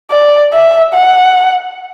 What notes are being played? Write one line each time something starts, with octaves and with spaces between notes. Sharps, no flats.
D5
E5
F#5